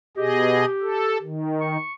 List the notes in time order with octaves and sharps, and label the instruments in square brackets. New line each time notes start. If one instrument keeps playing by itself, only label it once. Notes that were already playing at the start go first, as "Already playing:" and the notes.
[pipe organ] B2 G#4 D#5 [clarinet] G4
[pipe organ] A4
D#3
[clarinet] C#6